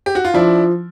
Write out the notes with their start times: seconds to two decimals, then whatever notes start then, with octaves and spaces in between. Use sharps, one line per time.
0.06 G4
0.15 F#4
0.25 F4
0.34 F3 D4 E4